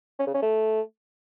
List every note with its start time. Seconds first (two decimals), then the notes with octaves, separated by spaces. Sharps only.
0.19 C#4
0.27 C#3
0.35 C#4
0.42 A3